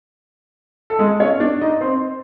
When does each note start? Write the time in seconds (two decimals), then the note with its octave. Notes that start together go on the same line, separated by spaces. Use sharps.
0.90 A4
0.99 G#3 G#4
1.20 C#4 C#5
1.40 D4 D5
1.61 D#4 D#5
1.81 C4 C5